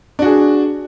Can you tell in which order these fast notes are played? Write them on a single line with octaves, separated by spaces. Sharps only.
D4 F#4 G#4